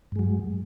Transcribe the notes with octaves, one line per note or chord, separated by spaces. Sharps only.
G2 F#3 G#3